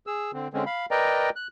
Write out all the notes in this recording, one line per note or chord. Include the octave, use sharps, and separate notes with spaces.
G#4 E6
D3 C4
D3 G#3 C4 C#4
F5 B5
A#4 B4 D5 D#5 G5 A#5
F#6